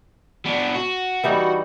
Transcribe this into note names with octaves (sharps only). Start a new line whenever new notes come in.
B3 D4
F#4
E3 G3 D#4